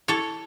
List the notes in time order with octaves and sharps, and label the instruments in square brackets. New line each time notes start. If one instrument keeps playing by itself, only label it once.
[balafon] E4 [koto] A4 C#5